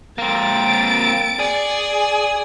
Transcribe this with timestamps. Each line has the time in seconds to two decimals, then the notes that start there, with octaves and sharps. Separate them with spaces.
0.18 A#3 C4 A6 D7
1.39 G#4 D5